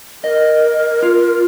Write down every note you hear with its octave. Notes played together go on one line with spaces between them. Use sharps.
A#4 D#5
F4